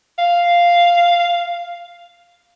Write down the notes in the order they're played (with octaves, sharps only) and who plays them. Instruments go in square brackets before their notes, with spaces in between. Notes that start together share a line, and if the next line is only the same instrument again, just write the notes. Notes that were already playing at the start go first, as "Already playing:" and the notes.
[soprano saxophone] F5